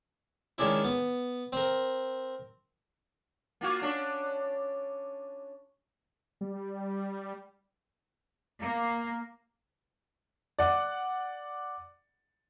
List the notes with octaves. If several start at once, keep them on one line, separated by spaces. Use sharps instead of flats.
D#3 G#3 C#4 D4 E4
B3
C4 A#4
A#3 F4 F#4
C#4 D4
G3
A#3
D5 F#5